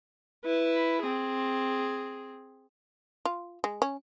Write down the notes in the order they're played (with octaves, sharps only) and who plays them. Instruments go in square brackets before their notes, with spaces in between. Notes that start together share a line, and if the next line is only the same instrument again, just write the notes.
[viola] E4 B4
C4 G#4
[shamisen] F4
G#3
C#4